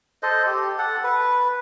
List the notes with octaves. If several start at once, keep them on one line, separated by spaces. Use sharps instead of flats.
A4 C5 D#5
G4
A4 F#5
B4